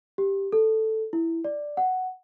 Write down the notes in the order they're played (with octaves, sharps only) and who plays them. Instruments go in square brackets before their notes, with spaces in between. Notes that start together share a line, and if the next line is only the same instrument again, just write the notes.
[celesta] G4
A4
E4
D5
F#5